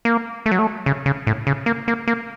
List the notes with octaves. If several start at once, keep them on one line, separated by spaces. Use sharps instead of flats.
A#3
A3
F#3
A3
C#3
C#3
A2
C#3
A#3
A#3
A#3